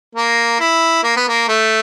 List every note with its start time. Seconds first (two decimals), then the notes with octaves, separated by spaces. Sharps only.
0.15 A#3
0.60 E4
1.03 A#3
1.17 B3
1.28 A#3
1.48 A3